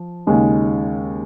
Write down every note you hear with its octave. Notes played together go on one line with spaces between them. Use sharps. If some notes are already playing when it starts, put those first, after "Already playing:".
Already playing: F3
D#2 C#3 G#3